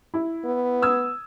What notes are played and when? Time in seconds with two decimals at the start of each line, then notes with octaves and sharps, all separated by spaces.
0.14 E4
0.44 B3
0.82 D#6 E6 G#6